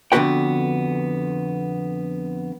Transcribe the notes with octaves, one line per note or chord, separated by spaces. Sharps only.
F2 D3 B3 F#4 B4 G5